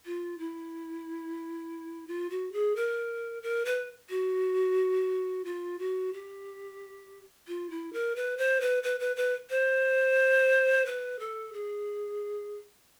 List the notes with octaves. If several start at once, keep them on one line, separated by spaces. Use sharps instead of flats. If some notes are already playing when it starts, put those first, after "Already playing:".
F4
E4
F4
F#4
G#4
A#4
A#4
B4
F#4
F4
F#4
G4
F4
E4
A#4
B4
C5
B4
B4
B4
B4
C5
B4
A4
G#4